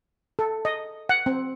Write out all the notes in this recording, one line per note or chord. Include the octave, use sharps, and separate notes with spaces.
A4
D#5
F#5
C4